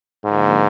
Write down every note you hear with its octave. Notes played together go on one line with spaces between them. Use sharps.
G#2 D3 F3 A#3